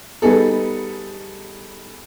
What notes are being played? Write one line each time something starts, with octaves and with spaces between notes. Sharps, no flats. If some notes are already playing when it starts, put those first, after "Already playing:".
G3 B3 D#4 G#4 A4